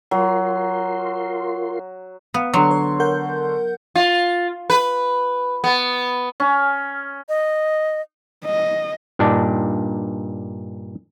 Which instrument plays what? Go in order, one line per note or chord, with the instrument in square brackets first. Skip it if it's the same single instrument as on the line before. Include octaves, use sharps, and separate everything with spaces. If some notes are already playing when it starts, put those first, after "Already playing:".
[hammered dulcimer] F#3 [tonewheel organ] F4 A#4 C6
[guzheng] B3 [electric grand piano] F5
[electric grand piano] D3 C6 C#6 [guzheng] F#3
[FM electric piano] C#5
A#4 F#5 G6
[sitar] F4
B4
B3
[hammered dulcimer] C#4
[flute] D#5
[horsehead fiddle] D#5
[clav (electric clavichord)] G2 A#2 D4 D#4 D5 A5